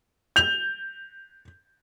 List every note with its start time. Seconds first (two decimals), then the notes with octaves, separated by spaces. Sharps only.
0.36 G6 F7